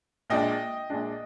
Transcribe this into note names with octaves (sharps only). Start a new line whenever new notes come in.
A#1 A#2 G#3 D4 D#5 G5
A#1 A#2 G#3 D4